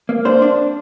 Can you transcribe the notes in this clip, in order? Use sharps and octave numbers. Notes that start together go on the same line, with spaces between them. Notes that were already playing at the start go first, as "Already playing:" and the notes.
A#3
D4 C5
D4